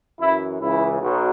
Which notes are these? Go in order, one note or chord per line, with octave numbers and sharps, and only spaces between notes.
F#2 E3 E4
C#2 C#3 E3 E4
B1 B2 F#3